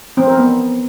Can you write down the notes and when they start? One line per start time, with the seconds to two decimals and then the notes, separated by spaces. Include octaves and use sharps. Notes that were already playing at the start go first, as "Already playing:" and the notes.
0.17 C4
0.27 A#4
0.37 B3